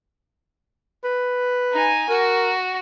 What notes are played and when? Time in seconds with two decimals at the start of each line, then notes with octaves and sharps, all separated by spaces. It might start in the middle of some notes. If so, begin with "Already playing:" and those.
1.04 B4
1.73 D#4 G#5
2.09 F#4 A#4